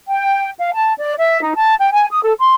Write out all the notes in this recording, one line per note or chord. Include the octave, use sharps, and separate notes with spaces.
G5
F5
A5
D5
E5
D#4
A5
G5
G#5
D#6
A4
C6